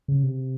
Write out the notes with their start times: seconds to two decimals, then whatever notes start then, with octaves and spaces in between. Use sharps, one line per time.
0.08 C#3
0.23 C3